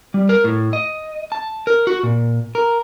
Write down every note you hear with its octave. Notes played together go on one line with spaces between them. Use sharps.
G3
A#4
A2
D#5
A5
A#4
F#4
A#2
A#4